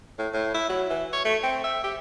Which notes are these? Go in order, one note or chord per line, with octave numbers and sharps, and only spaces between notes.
A2
A2
E4
F#3
E3
C#5
A3
C4
E5
G4